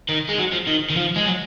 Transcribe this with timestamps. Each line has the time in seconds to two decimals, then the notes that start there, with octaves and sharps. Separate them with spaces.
0.09 D#3
0.29 G#3
0.38 F#3
0.52 F3
0.67 D#3
0.90 D#3
0.96 F3
1.16 G#3
1.26 F#3